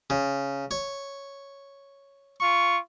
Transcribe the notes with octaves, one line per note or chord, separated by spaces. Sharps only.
C#3
C#5
F4 C#6